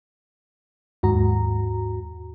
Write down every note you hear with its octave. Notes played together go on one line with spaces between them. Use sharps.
D#2 G#2 F#4 A#5